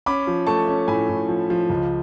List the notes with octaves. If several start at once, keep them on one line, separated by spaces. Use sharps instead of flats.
C#4 B5 D6
F3
A3 A5 C#6
C#4
A2 G#5 B5
A2
F3
F3
C#2